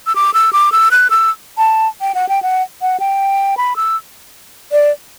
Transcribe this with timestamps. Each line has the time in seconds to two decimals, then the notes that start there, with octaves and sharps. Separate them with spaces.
0.07 E6
0.16 D6
0.34 E6
0.53 D6
0.72 E6
0.91 F#6
1.10 E6
1.58 A5
2.01 G5
2.15 F#5
2.29 G5
2.43 F#5
2.82 F#5
3.00 G5
3.57 B5
3.76 E6
4.72 D5